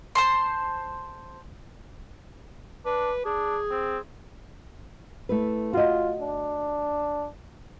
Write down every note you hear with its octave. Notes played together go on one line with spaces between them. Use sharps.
C5 A5 C6
D4 B4
D4 G#4
C4
A3 E4 B4
F4 F#4 D#5
D4